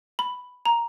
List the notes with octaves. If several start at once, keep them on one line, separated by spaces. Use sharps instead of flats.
B5
A#5